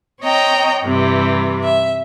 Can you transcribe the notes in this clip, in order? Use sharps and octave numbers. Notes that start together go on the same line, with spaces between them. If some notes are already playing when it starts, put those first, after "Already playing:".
C4 C#5 D#5 G5 A#5
G2 C3 E3
E5